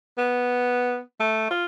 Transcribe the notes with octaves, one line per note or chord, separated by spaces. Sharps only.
B3
A3
F4